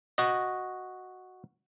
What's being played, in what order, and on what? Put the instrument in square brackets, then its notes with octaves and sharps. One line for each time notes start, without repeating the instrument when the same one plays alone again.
[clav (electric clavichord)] F#4 D#5